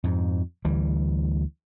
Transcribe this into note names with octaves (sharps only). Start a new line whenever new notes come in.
F2 G#2
D2 E3 G3